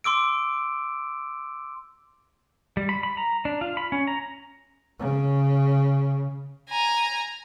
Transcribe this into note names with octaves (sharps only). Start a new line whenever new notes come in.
C6 D6 E6 D7
G3
B5
B5
A#5
D4
F4
B5
C#4
A#5
C#3
G#5 A#5